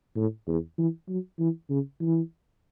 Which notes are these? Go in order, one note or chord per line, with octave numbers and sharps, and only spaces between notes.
A2
E2
E3
F#3
E3
C#3
E3